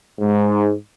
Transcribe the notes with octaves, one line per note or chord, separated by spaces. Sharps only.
G#2